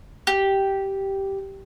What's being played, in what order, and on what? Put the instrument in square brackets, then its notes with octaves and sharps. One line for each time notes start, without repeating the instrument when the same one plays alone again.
[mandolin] G4